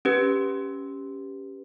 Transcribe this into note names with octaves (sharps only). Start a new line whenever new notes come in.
C#4 G4 B4